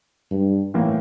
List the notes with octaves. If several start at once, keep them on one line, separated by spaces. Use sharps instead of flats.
G2
A2 E3 A#3